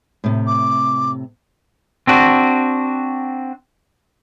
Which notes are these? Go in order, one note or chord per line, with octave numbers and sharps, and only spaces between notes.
A2 C3
D6
C4 D4 F#4